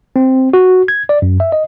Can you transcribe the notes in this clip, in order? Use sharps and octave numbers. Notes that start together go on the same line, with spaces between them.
C4
F#4
G#6
D5
F#2
E5
D#5